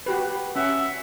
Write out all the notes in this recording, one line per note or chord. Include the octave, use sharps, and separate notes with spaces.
F#4 G4 B4
C#4 E5 F#5